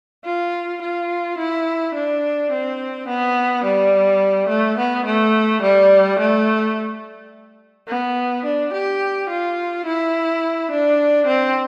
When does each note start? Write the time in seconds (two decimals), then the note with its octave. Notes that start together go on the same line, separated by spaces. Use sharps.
0.25 F4
0.81 F4
1.38 E4
1.95 D4
2.51 C4
3.08 B3
3.64 G3
4.48 A3
4.78 B3
5.05 A3
5.62 G3
6.19 A3
7.88 B3
8.45 D4
8.73 G4
9.29 F4
9.85 E4
10.71 D4
11.27 C4